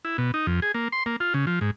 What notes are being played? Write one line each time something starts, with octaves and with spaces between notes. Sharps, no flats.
E4
B2
D#4
F2
G#4
A#3
C6
A#3
F4
C#3
F3
G#2